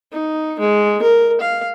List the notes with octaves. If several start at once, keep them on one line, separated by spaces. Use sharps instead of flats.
D#4
G#3
A#4
F5